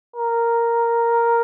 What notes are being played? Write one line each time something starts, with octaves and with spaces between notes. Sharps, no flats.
A#4